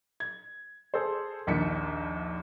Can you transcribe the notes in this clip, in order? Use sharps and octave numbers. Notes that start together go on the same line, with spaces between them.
G#6
G#4 A4 C5
A#1 D#2 D#4 B6 C#7